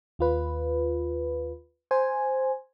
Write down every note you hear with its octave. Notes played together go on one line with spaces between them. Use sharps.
D#2 F4 B4
C5 G#5